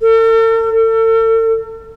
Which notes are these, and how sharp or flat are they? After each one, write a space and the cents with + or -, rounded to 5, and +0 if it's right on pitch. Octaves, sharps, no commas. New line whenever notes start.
A4 +45
A4 +40